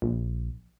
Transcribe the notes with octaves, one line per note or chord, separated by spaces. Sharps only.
A#1